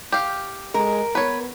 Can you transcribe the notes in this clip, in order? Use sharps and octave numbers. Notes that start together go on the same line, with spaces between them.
G4 F5
G#3 A#4
B3 B4 C#5